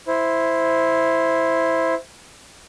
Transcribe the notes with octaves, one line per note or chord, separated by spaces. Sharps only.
E4 C5